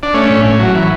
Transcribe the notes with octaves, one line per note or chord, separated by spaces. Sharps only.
D4
A3 C#4
A2
A2
F#3
E3